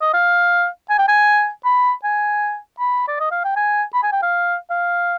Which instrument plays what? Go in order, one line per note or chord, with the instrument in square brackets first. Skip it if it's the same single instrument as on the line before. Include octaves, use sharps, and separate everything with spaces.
[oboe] D#5
F5
G#5
G5
G#5
B5
G#5
B5
D5
D#5
F5
G5
G#5
B5
G#5
G5
F5
F5